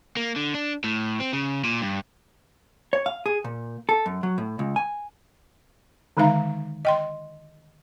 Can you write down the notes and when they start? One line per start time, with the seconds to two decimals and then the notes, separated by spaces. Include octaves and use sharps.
0.17 A#3
0.36 D3
0.54 D4
0.84 A2
1.20 C4
1.33 C#3
1.64 A#2
1.82 G2
2.93 C#5
3.06 F5
3.26 G#4
3.44 A#2
3.89 A4
4.06 F#2
4.23 F#3
4.38 A2
4.59 C#2
4.76 G#5
6.17 D3 D#3 G#3 D#4 F5 A#5
6.85 D#5 G5 C6